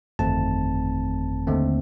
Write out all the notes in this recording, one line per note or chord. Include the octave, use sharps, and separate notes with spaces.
G1 F2 D#3 A3 C4 A5
D#2 D3 A3 C4